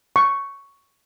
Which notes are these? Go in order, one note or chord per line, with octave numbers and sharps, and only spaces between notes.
C#6